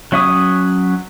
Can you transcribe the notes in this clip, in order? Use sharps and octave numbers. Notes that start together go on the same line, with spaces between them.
F#3 C#4 E5 C#6 D#6